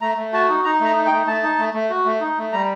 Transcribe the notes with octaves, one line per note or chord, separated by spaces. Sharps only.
A3 A#5
A3
F#4 A5
D#4
D#4 A#5
A3 A#5
D#4
G5
A3
A3 A5
D#4
A3
A3
F#4
A3
D#4
A3
G3 A#5